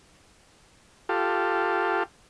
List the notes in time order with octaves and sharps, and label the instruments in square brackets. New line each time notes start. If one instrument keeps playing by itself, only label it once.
[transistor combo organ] F4 G4 A4